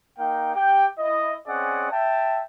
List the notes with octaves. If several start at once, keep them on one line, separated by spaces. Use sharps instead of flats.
A#3 D#4 F5 G5
G4 G5
E4 D#5
C4 C#4 G#4 D5 D#5 F#5
E5 G5 A5